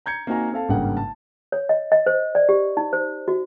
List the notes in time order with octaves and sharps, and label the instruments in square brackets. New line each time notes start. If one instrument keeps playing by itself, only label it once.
[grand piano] A#5 G6 G#6 C#7
A#3 C4 D#4 F#4 G#5 A#5
C4 A4 F5 A5
G#1 G2 C#3 A#3 F#5 G5
A5
[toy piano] C#5
D#5
D#5
C5
D5
G4
D#4
C5
F#4